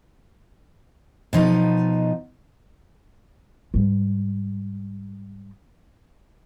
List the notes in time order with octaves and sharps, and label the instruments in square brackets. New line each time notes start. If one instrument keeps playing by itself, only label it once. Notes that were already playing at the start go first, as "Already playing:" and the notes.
[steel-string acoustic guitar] B2 F3 D#4
[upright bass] G#2 G3